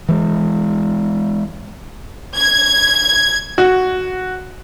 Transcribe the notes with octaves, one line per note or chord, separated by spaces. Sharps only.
E3 G#3
G#6
F#4